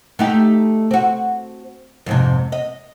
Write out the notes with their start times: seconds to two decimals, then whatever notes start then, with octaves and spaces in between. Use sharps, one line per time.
0.19 A3 D#4 G4
0.91 C4 F#4
2.06 F2 G#2 C3
2.52 D#5